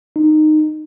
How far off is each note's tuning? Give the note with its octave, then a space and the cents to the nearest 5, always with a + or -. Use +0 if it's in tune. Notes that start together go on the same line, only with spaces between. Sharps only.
D#4 -15